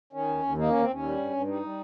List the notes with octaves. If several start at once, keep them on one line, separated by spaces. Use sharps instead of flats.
D#3 C#4
D#2
D#2
A#3 D#4
D#2 C#4
C4
D#2 C#4
G3
G2
G2
G3 D#4
G3